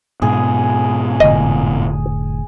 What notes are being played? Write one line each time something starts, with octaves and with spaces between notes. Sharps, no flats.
G#2 B2 G#3 G#4
F1 A2 D3 D#5